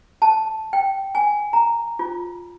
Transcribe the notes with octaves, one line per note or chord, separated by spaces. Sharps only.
A5
G5
G#5
A#5
F4